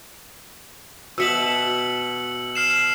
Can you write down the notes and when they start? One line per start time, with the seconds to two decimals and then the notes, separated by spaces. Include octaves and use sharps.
1.18 B2 E5 A5 E6 C#7 F#7
2.55 F6 C7 E7